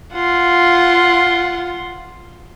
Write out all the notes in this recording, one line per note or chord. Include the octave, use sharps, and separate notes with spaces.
F4 F#5 C6